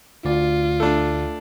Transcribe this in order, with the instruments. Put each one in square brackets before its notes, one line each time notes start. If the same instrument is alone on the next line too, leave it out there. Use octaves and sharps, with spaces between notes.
[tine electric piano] D2 D5 [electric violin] F4
[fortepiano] A3 D4